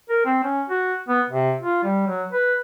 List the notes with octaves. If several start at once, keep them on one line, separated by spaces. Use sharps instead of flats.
A#4
C4
C#4
F#4
B3
C3
F4
G3
F#3
B4